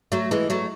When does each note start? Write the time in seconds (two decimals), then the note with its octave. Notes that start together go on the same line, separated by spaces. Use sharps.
0.12 F#3 A3
0.31 E3 G#3
0.50 F#3 A3